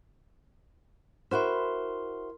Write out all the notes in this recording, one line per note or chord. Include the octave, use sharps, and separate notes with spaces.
E4 F#4 A#4 C5 C6